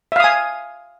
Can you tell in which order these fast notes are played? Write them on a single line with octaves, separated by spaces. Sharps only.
E5 F5 D#6 G#5